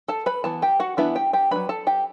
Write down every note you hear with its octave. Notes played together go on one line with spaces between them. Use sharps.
A4 A5
B4 B5
E3 B3 A5
G4 G5
F#4 F#5
E3 B3 D4 E4 E5
G4 G5
G4 G5
F#3 A3 D4 B4 B5
A4 A5
G4 G5